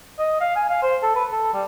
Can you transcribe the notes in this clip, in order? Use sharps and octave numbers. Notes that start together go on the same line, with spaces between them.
D#5
F5
G#5
F5
C5
A4
B4
A4
G3